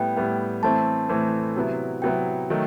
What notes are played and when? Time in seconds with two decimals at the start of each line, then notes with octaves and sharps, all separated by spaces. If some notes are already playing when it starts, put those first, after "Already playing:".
Already playing: A2 G3 B3 E4 G5
0.16 A2 G3 B3 E4
0.63 A2 E3 A3 C4 E4 A5
1.09 A2 E3 A3 C4 E4
1.56 C3 F#3 B3 E4
2.02 C3 F#3 B3 E4 G5
2.50 D#3 F#3 A3